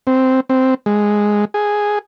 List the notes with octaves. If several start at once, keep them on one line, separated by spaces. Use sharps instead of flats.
C4
C4
G#3
G#4